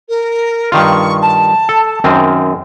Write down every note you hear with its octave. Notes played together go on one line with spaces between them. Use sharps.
A#4
G2 D#3 F4 C#6
A5
A4
F#2 D#3 C4